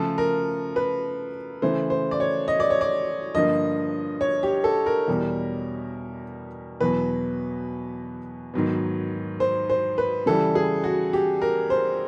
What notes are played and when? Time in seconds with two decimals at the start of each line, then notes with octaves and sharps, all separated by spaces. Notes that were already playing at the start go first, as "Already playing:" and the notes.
Already playing: C#3 F3 A3 A4
0.18 A#4
0.76 B4
1.62 C#3 E3 A3 C5
1.90 C5
2.11 D5
2.20 C#5
2.48 D#5
2.60 D5
2.70 C#5
2.81 D5
3.35 G2 D3 F3 A#3 D#5
4.21 C#5
4.43 G4
4.64 A4
4.86 A#4
5.08 E2 B2 G3
6.80 E2 B2 F#3 B4
8.54 G#2 D#3 F#3 B3
9.40 C5
9.70 C5
9.98 B4
10.26 C#3 E3 G3 A4
10.55 G#4
10.84 F#4
11.13 G4
11.41 A#4
11.70 C5